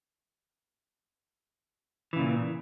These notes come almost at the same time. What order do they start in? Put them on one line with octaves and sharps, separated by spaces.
E3 C#3 A#2